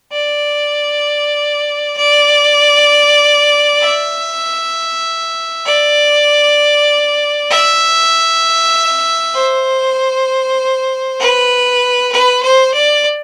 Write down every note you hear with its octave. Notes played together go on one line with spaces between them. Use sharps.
D5
D5
E5
D5
E5
C5
B4
B4
C5
D5